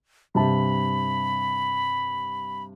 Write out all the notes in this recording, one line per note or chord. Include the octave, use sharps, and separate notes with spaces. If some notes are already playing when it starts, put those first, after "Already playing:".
G2 C3 A5 B5